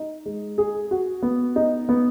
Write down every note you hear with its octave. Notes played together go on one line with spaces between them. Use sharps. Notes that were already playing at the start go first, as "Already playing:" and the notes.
Already playing: D#4
G#3
G#4
F#4
B3
D#4
B3